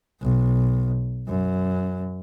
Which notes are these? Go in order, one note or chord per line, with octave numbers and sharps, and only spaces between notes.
B1
F#2